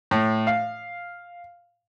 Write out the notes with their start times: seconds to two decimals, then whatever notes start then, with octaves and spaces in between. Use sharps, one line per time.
0.11 A2
0.47 F5